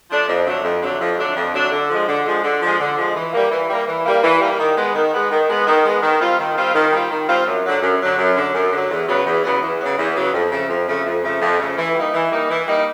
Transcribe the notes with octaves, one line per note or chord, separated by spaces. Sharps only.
F3 A3 D4
F2
D3 F#3 A3 D4
F2
D3 F#3 A3 D4
F2
D3 F#3 A3 D4
F2
D3 F#3 A3 D4
D3
F3 G#3
D3
F3 G#3
D3
F3 G#3
D3
F3 G#3
E3
G3 A#3
E3
G3 A#3
E3
G3 A#3
E3
G3 A#3
D#3
G#3 B3
D#3
G#3 B3
D#3
G#3 B3
D#3
G#3 B3
D#3
G3 C4 F4
D#3
G3 C4 F4
D#3
G3 C4 F4
D#3
G3 C4 F4
F#2
D3 F#3
F#2
D3 F#3
F#2
D3 F#3
F#2
D3 F#3
E2
C#3 F#3 B3
E2
C#3 F#3 B3
E2
C#3 F#3 B3
E2
C#3 F#3 B3
F2
C#3 F3 A3
F2
C#3 F3 A3
F2
C#3 F3 A3
F2
C#3 F3 A3
E3
G3 A#3 D#4
E3
G3 A#3 D#4
E3
G3 A#3 D#4